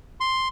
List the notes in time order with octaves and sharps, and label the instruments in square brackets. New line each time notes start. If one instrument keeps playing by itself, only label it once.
[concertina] C6